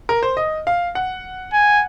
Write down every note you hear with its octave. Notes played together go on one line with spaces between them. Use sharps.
A#4
C5
D#5
F5
F#5
G#5